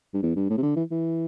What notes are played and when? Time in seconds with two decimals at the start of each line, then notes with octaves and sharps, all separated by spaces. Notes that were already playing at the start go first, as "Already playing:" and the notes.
0.14 G2
0.22 E2
0.36 G2
0.50 A2
0.58 C3
0.62 D3
0.76 E3
0.91 E3